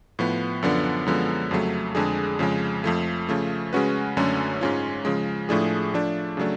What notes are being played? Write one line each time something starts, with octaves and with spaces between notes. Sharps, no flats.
A2 F3 B3
F#2 D3 F3 B3 D4
F#2 D3 F3 G#3 B3
F2 C#3 F#3 A3
F2 D3 G#3 D4 G#4
F2 C#3 F3 G#3
F2 F3 A3
C#3 F3 A3
C#3 G#3 C#4 F#4 B4
F#2 D3 F#3 A3 C#4
G#2 G#3 C#4 F4
C#3 F3 G#3
A2 F3 A3 D4 G#4
F3 A3 D4
C#3 F#3 A3 D4